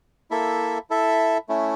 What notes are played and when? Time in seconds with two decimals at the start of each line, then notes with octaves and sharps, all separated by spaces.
0.31 A#3 E4 A4 E5
0.90 E4 A4 E5
1.49 A3 C#4 E4